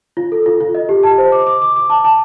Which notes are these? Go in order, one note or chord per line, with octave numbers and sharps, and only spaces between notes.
F4
A4
F4
F4
D#5
G4
A5
C5
D6
D6
D6
D6
A5
A5